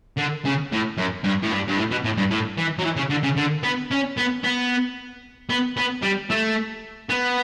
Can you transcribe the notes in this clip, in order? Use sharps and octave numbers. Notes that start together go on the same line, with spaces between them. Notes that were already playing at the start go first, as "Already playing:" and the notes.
D3
C#3
A2
F#2
G2
A2
G2
G2
A2
B2
A2
G2
A2
E3
F#3
E3
C#3
D3
C#3
D3
B3
C#4
B3
B3
B3
B3
G3
A3
B3